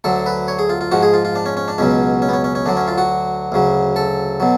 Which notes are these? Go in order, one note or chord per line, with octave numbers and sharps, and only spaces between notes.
D2 D3 F#3 A4
B4
C#5
G#4
F4
F4
G#2 F3 F#4
G#4
F4
F4
D4
C#4
C#4
D4
C#2 B2 F#3 C#4
C#4
B3
C#4
C#4
C#4
D2 D3 F#3 D4
C#4
F4
F#4
D2 C#3 F#3
A4
B2 F#3